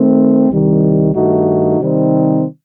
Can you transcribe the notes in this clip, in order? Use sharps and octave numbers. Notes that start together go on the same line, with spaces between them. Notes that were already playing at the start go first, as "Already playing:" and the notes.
Already playing: D#3 A3 C4
C2 C3 D#3 G3
G2 D#3 A3 D#4 F#4
C3 D#3 G3 C4 D#4